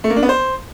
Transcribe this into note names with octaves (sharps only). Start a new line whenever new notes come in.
A3
A#3
D4
B3
C5